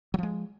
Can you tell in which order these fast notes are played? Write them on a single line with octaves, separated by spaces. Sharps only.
F#3 F3 G#3